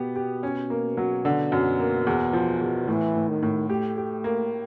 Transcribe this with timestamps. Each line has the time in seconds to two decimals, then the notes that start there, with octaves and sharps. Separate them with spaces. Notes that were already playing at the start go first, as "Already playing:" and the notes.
Already playing: B2 B3 G4
0.16 G4
0.43 C#4
0.70 A#3
0.97 F#3
1.25 D3
1.52 F#2
1.80 A#3
2.07 E2
2.33 F3
2.61 E2
2.88 A2 E3
3.16 A2
3.29 D#3
3.42 A2
3.70 A3 G4
3.97 G4
4.24 A#3